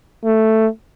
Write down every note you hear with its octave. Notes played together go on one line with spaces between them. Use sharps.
A3